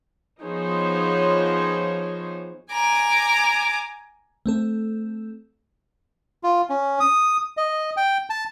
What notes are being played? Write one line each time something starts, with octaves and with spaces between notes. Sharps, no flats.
F3 B3 D#4 G#4 C5 C#5
G#5 A#5 D6
A3 C4 A4
F4
C#4
D#6
D#5
G5
A5